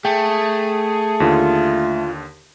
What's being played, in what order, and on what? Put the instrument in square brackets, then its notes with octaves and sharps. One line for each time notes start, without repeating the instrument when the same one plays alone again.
[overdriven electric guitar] A3 [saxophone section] G#4 [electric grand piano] G5
[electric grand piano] D#2 D3 [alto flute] F4